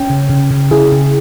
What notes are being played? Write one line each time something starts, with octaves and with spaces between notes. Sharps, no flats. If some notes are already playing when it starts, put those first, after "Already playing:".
Already playing: C#4 G5
C#3
C#3
C#3
C#3 E4 G#4
C#3